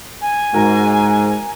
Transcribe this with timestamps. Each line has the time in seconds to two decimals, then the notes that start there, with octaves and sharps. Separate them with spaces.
0.21 G#5
0.53 G#2 F#4 A#4